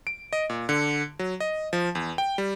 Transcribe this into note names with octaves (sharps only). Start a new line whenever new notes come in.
D7
D#5
A#2
D3
F#3
D#5
F3
E2
G5
G3